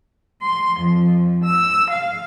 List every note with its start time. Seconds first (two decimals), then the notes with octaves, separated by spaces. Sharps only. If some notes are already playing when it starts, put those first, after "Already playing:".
0.41 C6
0.80 F2
1.44 E6
1.91 F5